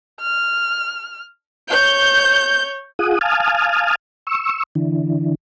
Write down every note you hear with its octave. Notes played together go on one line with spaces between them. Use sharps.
F6
C#5 G6
F4 G#4 F#5 D#6
F5 G#5 A5 D#6 F6
C#6 E6
D3 E3